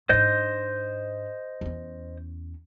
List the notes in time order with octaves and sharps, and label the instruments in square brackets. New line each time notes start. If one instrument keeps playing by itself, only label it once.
[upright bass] G#2 D4 [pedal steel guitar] C5 D#5 G6
[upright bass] E2 C#4